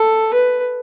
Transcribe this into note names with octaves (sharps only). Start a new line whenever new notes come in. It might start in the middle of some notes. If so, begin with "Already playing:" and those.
Already playing: A4
B4